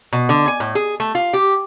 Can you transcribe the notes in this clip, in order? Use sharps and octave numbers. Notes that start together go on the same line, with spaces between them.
B2
D3
G#5
A2
G#4
A3
F4
G4